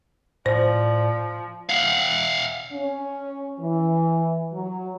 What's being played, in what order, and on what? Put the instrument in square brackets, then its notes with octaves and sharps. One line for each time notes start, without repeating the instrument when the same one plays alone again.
[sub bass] A2 [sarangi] F3 [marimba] C5 [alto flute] D5
[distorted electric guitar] F5 F#5
[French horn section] C#4
E3
F#3